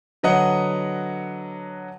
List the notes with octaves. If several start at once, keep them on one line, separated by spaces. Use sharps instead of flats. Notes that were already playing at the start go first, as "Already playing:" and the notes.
D3 F#3 B4 D#5 F#5